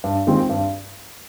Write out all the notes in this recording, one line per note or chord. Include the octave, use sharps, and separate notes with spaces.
G2
D#3 G#3 C4 F4
G2